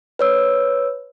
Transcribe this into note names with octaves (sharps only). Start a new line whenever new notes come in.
B4 C#5 E6